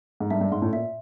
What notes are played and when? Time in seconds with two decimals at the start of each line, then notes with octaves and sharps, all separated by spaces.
0.20 G#2
0.31 G2 E5
0.41 G2
0.52 G#2 C6
0.62 A2
0.72 A#2 E5